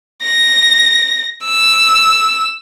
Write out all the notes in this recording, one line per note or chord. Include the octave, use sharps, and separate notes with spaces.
A#6
E6